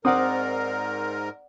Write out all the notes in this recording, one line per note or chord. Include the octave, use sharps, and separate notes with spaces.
G#2 C4 A#4 D5 F#5 D#6